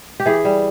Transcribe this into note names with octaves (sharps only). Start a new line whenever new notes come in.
G4
E3 G#4
G3